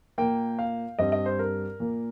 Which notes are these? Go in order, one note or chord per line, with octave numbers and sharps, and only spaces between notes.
A#2 A#3 G5
F5
G2 G3 C4 D#5
D#5
C5
A#4
A#2 A#3